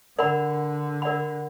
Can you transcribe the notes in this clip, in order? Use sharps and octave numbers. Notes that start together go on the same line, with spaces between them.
D3 A#4 D5 F#5 B5
A#4 D5 F#5 B5